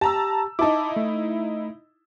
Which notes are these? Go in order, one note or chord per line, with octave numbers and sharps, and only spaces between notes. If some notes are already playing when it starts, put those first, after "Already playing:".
G4 A5 A#5 E6
D#4 E4 A5 D6
A3